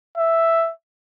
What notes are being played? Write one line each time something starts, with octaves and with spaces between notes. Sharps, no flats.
E5